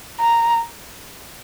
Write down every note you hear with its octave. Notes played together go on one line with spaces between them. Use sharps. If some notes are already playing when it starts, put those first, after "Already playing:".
A#5